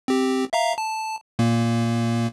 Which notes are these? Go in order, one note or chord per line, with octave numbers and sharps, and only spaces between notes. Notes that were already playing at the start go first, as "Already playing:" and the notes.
C4 G4
E5 F5 A#5
A5
A#2 A#3